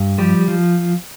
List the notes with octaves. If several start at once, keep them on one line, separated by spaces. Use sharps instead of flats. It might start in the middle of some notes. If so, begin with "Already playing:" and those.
Already playing: G2
F3 G3 G4
F3